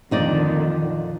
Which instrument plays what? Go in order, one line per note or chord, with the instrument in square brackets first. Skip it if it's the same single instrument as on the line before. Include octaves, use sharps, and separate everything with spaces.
[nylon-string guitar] F2 D#4 D5 [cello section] A#2 D3 D#3